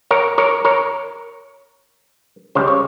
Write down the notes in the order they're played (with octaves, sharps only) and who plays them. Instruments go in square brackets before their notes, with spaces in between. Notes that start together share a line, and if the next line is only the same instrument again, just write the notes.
[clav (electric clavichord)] A#4 C#5
A#4 C#5
A#4 C#5
C#2 C#3 G3 C5
C#5